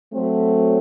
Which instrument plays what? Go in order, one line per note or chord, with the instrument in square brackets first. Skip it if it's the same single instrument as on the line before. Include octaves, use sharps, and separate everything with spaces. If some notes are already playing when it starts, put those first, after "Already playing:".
[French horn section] F#3 A3 C4